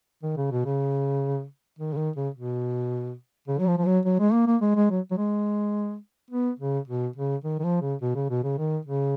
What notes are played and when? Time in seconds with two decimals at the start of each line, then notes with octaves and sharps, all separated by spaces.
0.23 D#3
0.37 C#3
0.51 B2
0.65 C#3
1.79 D#3
1.93 C#3
1.97 D#3
2.16 C#3
2.35 B2
3.48 C#3
3.58 F#3
3.67 F3
3.78 F3
3.86 F#3
4.05 F#3
4.19 G#3
4.32 A#3
4.47 A#3
4.62 G#3
4.75 G#3
4.90 F#3
5.11 F#3
5.17 G#3
6.31 B3
6.59 C#3
6.88 B2
7.16 C#3
7.44 D#3
7.59 D#3
7.64 F3
7.82 C#3
8.02 B2
8.15 C#3
8.30 B2
8.43 C#3
8.58 D#3
8.85 C#3